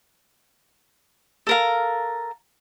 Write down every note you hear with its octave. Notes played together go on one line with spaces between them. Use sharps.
A4 A#4 F5